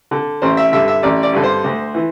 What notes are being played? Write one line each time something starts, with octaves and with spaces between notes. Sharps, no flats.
D3
A1 C5
E5
G2 D3 E5
E5
A1 D5
D5
G2 D3
C5
D2
E3